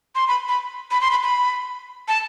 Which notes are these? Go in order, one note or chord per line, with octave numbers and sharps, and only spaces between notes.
C6
B5
B5
B5
C6
B5
B5
A5